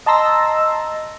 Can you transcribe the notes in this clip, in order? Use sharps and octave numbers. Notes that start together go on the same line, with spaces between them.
D#5 A5 A#5 C6 E6 A#6